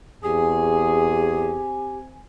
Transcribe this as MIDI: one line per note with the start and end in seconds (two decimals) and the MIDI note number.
0.24 1.60 40
0.24 2.23 60
0.24 1.98 67
0.24 1.65 68
0.24 2.23 80